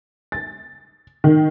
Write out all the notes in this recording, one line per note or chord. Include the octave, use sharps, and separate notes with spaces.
A6
D#3